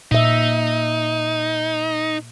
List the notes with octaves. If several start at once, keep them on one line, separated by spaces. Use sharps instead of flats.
A#2 D#4 E5